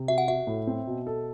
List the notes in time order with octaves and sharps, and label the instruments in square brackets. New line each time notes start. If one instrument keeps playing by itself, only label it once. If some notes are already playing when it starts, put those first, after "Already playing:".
Already playing: [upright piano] C3
[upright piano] F#4 [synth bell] E5
[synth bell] F#5
[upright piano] F#4 [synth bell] E5
[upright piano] A2
C4
B2
A4